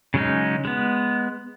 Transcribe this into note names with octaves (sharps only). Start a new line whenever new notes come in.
C#3 F#3 G#3 C#4 D#4
G#3 B3